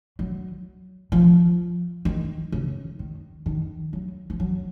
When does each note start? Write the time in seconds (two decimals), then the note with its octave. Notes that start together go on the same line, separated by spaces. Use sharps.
0.19 F#3
1.12 F3
2.05 D#3
2.52 C#3
2.99 D#3
3.46 D#3
3.93 F#3
4.30 F3
4.40 F#3